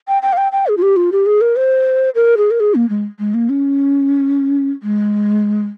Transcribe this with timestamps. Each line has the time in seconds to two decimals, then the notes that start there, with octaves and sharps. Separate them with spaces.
0.08 G5
0.22 G5
0.33 F5
0.37 G5
0.52 G5
0.67 G#4
0.77 F4
0.82 G4
0.96 F4
1.12 G4
1.26 G#4
1.41 A#4
1.56 C5
2.15 A#4
2.37 G#4
2.51 A#4
2.60 G#4
2.75 A#3
2.89 G#3
3.19 G#3
3.34 A#3
3.49 C#4
4.83 G#3